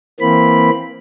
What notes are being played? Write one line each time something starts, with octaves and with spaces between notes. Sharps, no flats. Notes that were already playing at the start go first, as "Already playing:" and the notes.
E3 A#3 C4 B5